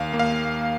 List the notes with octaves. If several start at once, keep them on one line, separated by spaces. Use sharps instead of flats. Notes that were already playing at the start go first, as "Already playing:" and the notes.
Already playing: D#2 F5
A#3
F5